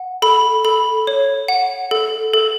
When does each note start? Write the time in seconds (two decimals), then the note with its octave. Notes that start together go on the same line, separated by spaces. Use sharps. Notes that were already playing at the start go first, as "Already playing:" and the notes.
Already playing: F#5
0.22 A4 B5
0.65 A4 B5
1.07 C#5
1.48 F#5
1.91 A4
2.34 A4